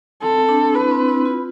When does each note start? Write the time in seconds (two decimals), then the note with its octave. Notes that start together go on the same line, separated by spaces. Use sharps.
0.22 C4 A4
0.43 C4
0.49 D4
0.73 E4 B4
0.91 C4
1.08 E4
1.25 F4